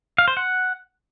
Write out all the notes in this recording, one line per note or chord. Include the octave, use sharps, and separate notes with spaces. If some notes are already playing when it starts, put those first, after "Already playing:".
F5
C5
F#5